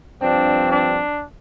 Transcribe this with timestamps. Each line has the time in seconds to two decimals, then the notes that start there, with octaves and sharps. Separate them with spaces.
0.21 G2 F3 C4 D4
0.69 D4